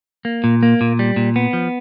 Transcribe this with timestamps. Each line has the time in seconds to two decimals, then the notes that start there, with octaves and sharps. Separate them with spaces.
0.25 A#3
0.44 A#2
0.63 A#3
0.81 A#2
0.99 G3
1.16 A#2
1.36 B3
1.53 F3